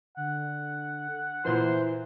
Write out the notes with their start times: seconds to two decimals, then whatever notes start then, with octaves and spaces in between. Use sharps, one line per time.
0.17 D3 F#5
1.45 A#2 E3 E4 C5